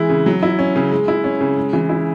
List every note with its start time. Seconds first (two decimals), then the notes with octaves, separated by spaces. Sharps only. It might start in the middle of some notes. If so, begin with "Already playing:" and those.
Already playing: E3 G#3 E4
0.09 C#3
0.26 F#3
0.43 E4
0.59 C#4
0.76 C#3
0.92 G#3
1.08 E4
1.24 C#4
1.40 C#3
1.57 G#3
1.73 E3
1.89 E4